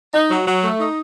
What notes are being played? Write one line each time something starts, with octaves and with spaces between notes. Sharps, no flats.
D#4
F#3
F#3
A3
D#4